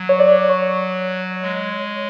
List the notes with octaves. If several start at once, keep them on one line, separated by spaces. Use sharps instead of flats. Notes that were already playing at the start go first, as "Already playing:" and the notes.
Already playing: F#3
C#5
D5
C#5
G#3